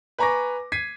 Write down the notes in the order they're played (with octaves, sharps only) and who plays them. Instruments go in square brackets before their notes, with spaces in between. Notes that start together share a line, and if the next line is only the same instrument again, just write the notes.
[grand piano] B4 G#5 A#5 C#6 D6 A#6
G#6 B6 C7 D#7